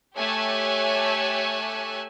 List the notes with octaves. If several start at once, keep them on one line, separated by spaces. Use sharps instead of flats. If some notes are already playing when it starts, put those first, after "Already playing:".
A3 G4 C#5 G#5 E6 F#6